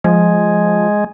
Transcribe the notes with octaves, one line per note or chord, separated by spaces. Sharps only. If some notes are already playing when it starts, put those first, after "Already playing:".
F3 G#3